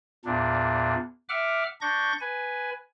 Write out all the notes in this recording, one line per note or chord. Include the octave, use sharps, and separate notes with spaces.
E2 A#2 D4
E5 F#5 D6 F6
D4 C#6 G6 A#6
B4 G#5